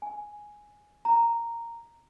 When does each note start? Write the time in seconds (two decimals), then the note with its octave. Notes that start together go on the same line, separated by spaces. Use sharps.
0.02 G#5
1.05 A#5